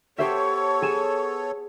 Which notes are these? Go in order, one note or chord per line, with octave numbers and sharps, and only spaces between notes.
B3 G4 A4 C5 C#5 E5 C#6
G#4 G#5 E7